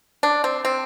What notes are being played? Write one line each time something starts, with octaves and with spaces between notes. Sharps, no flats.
D4
C4
C4